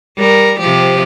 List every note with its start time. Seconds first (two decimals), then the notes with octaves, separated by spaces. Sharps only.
0.17 G3 A#4
0.60 C3 F3 G4